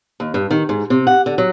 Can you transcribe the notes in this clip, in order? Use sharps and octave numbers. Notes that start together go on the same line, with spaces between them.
D#2
G2
D#3
G#2
C3
F#5
D3
F#3